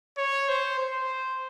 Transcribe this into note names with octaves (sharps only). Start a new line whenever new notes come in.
C#5
C5
C5